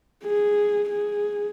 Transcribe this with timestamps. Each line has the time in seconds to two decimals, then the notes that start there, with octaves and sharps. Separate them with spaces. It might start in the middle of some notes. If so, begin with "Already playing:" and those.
0.25 G#4
0.89 G#4